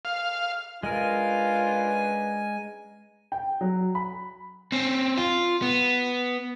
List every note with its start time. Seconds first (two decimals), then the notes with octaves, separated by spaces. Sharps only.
0.05 F5
0.83 G#3 C#4 D4 F4 A#4 B4 G#5
3.32 G5
3.61 F#3
3.95 B5
4.72 C4 C#4
5.18 F4
5.62 B3